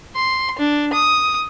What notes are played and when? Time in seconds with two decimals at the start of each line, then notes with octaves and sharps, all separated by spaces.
0.16 C6
0.59 D4
0.94 D#6